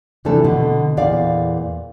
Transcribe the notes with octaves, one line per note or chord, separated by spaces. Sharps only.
C3 E3 F3 A3 D4 A4
B2 D3
E2 A#2 D5 F5